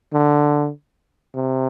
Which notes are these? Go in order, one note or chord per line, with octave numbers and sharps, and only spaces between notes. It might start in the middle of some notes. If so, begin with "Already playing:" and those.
D3
C3